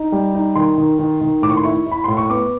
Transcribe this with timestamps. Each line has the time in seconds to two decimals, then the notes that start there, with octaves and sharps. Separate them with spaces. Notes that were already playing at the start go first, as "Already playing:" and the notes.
Already playing: D#4
0.12 G3
0.34 D#4
0.55 D#3 C6
0.78 D#3
0.99 D#3
1.21 D#3
1.42 A2 D6
1.50 C#6
1.57 C6
1.63 E4 C#6
1.87 E4 B5
2.04 A2 C6
2.17 C#6
2.30 B3 D6